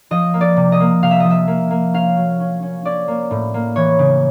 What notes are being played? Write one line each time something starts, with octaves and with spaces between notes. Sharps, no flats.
F3 D#5
A#3
D5
C3
D#5
A#3
C3 F5
E5
F3 D#5
E5
A#3
A#3
C#4 F5
F#3
C#4
C#4
C#4 D5
A#3
A2
A#3
E3 C#5
C#3